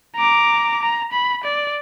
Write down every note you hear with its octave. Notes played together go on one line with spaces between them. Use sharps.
A#5 D6
A#5
B5
D5